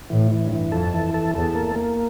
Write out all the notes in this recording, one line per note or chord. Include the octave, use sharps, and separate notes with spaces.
A2 E3
E3
G2
E3
F2 A4
E3
A4
E2 A4
A#3
A#3